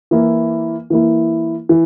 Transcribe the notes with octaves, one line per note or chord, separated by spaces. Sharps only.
E3 A#3 E4
E3 A#3 E4
E3